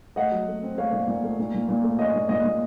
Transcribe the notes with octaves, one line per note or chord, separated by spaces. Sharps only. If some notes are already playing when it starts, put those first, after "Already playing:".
A3 D#5 F#5
F#3
A3
C4
A3 C#5 F5
A#2
A#2
A3
A#2
A#2
A#2
A3
C#4 D#5
A#2
A#2 D#5
A#2